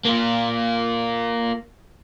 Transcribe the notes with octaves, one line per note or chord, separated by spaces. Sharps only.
A#3 F4